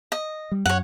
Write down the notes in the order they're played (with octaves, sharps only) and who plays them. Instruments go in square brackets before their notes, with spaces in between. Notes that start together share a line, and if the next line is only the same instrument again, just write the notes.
[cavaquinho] D#5
[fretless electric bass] G3
[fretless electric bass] F#2 [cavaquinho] C#5 F#5